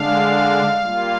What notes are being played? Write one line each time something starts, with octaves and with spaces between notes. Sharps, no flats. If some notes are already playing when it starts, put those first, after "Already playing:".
Already playing: D3 G#3 D4 F5
G3 A#3 F4